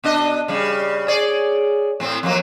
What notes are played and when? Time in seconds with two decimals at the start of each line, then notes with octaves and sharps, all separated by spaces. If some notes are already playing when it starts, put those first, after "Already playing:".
0.04 B2 D4 D#5
0.48 C#3 G3
1.08 G#4 C#5 D5
2.00 A2 C4
2.23 F2 F#3 A#3